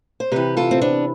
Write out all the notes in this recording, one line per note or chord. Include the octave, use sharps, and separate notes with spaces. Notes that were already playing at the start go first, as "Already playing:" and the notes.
C5
C3 E3 G4 B4
F4 A4
C4
B3 D4